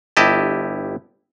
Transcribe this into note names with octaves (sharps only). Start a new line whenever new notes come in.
G1 E4 G4 D#5 A5